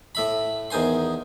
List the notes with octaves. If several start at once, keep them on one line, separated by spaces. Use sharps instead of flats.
A2 E5 B5
E2 D#3 C5 G#5 C6